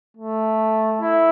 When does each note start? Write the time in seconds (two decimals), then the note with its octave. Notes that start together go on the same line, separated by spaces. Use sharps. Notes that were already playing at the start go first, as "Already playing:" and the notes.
0.17 A3
1.01 E4